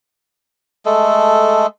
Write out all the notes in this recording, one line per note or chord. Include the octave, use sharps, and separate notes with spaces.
G#3 A3 A4